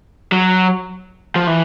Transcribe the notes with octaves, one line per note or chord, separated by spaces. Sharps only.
F#3
F3
E3